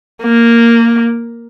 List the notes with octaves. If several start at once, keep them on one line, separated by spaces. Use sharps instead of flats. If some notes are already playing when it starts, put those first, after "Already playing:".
A#3